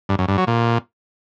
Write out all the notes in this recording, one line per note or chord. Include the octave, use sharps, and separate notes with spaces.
G2
F#2
G2
F#3
A#2